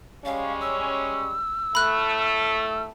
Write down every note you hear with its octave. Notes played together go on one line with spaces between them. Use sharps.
G3 G#3 C#4 F5
E6
A2 A3 B5 F#6